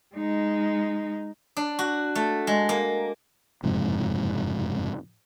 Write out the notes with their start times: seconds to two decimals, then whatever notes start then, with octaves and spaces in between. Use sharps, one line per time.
0.15 G#3 D#4
1.57 D4
1.79 F#4
2.15 A3
2.47 G#3
2.69 A#3
3.63 F#1 F2 G#2 C3